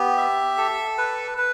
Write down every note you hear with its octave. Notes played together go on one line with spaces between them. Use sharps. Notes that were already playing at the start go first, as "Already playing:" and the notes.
Already playing: B3 G4
E5
A4
B4
B4